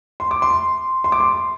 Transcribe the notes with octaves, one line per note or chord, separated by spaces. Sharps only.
C6
D6
C6
C6
D6
C6